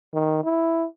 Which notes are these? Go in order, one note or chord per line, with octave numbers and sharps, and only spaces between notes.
D#3
E4